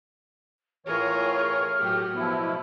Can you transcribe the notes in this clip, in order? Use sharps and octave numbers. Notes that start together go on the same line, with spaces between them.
A2 E3 F4 G#4 A#4 C#5 F6
A2 F#3 A3 G4
B2 F3 B3 E4